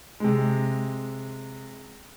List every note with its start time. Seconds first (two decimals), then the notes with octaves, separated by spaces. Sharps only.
0.20 C3 G#3